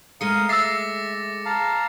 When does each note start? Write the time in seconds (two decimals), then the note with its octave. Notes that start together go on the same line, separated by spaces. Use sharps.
0.21 G#3 A3 A#4 F5 D#6 C#7
0.49 E5 D6 E6 A6 A#6 C7
1.45 F5 A5 A#5